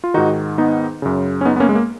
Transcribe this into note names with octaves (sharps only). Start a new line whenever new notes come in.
F4
G#2 D#3 D#4 F#4
B3 D#4
F#2 C#3
C#4
B3 D#4
B3
A#3 C#4
G#3
A#3